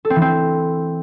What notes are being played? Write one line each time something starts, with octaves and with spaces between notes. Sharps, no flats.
A4
C4
E3
C4